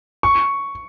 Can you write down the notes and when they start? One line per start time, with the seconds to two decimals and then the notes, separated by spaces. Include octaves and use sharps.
0.23 C#6